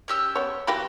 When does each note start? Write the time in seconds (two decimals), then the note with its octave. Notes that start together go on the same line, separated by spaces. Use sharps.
0.08 C#4 G4 E6
0.35 B3 C#5
0.67 E3 F#4 G4 B5 F#6